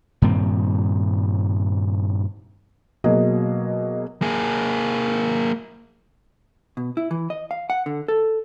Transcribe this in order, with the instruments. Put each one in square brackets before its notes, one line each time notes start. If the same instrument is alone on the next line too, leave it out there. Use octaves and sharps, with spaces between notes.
[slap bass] G2 A#2 D#3 C4
[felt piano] B2 F#3 A#3 G#4 D#5
[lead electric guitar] A#3 G#4
[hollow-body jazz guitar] B2
E4
E3
D#5
F5
F#5
D3
A4